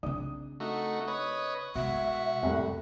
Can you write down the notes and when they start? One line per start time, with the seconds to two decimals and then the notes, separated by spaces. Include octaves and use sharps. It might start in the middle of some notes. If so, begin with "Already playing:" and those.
0.03 C#3 C4 D4 D#6
0.60 A3 D#4 F#4
1.08 B4 C#5 D#5
1.75 B2 G#3 F#4 E5
2.43 C2 F2 A2 G3